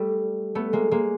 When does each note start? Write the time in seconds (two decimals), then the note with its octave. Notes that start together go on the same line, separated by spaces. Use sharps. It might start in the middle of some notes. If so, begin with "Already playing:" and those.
Already playing: G3 A3
0.55 A3 B3
0.73 G#3 A#3
0.91 G#3 A#3